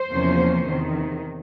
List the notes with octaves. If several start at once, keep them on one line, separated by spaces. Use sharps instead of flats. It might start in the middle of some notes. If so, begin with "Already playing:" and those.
Already playing: C5
E2 C3 F3 A#3 C#4
E2 C3 D#3